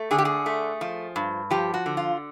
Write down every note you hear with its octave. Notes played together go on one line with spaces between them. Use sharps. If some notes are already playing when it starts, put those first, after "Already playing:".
Already playing: A3
D3 G#4
G4
G#4
A3
F3
G2
F3 G4
F#4
D3
F4